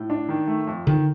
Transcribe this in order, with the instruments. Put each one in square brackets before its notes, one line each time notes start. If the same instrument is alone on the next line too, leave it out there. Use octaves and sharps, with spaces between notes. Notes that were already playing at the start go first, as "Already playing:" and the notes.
Already playing: [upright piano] A2
D4
D#3
A3
F2
[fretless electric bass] D3 [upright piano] D#3